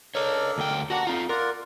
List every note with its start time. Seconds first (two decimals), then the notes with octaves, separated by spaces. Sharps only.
0.15 D4 A4 A#4 C#5 D#5
0.58 D2 G5
0.90 A#3 D4 F#4 F#5 A#5
1.07 C4 D#4 F4
1.29 F4 A#4 D5 F#5